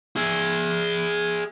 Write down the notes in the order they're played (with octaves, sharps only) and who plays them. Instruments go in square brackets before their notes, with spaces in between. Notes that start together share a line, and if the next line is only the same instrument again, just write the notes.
[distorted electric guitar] G#4 E5